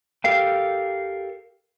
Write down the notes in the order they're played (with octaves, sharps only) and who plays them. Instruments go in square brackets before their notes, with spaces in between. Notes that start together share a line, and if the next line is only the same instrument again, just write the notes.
[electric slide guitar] G4 A4 A#4 F5 G5